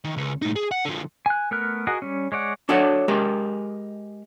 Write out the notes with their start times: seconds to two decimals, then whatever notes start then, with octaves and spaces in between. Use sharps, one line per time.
0.04 D#3
0.16 C#2
0.42 A2 D#4
0.56 G#4
0.71 F#5
0.85 D3 F3
1.26 G#5 F#6
1.51 A3 B3 A#4 F6 F#6
1.87 F#4 G#4 A#4 D#5 F#5
2.02 G3 C#4
2.32 G#3 C#5 D5 F#5
2.69 D4 F#4 A4 C#5 F#5
3.08 G#3 G4 A#4